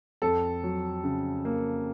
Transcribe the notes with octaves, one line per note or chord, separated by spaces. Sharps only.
F2 A4
F#3
C#3
A#3